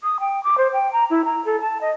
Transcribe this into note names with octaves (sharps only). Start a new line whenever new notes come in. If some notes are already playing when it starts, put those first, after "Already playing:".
D#6
G5
D6
C5
G5
A#5
E4
A#5
A4
A5
D#5